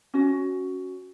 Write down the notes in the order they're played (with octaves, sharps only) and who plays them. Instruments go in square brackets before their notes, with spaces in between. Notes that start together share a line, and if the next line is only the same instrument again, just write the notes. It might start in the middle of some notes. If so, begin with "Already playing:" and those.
[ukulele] C#4 F#4